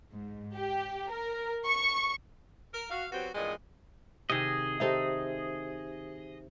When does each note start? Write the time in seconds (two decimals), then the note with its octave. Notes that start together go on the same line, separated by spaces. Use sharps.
0.12 G#2
0.54 G4
1.11 A#4
1.65 C#6
2.73 A#4
2.90 F#4 F5
3.11 F#3 B3 C4 F#4 G4
3.34 E2 G2 A#2 G#3 G#4 D#5
4.30 C3 D#3 G#4 D#5
4.80 D#3 D#4 G4 A4 C5 E5